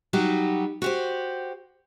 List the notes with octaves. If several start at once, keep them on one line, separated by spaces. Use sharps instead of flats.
F#3 G3 D#4 F#4 G4
F#4 G4 C5